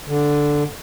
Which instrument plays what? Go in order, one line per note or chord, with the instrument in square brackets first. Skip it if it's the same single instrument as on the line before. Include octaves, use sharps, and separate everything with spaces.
[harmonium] D3